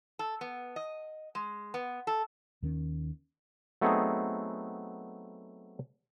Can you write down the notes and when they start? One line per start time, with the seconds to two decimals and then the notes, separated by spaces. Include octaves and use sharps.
0.19 A4
0.41 B3
0.76 D#5
1.35 G#3
1.74 B3
2.07 A4
2.62 D#2 D#3 C#4
3.81 F#3 A3 B3 C4 D#4 G#4